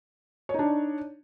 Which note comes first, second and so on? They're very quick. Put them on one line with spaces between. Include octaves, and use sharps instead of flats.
C#5 D#4 D4